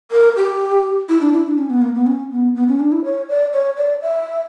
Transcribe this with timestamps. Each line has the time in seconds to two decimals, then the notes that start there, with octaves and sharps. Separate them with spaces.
0.11 A#4
0.37 G4
1.09 E4
1.21 D4
1.33 E4
1.46 D4
1.58 C#4
1.70 B3
1.82 A#3
1.95 B3
2.07 C#4
2.31 B3
2.55 B3
2.68 C#4
2.80 D4
2.92 E4
3.05 C#5
3.29 D5
3.53 C#5
3.77 D5
4.02 E5